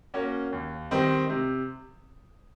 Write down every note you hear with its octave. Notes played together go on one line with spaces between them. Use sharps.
A#3 C#4 F#4
D#2
D#3 G3 C4 D#4
C3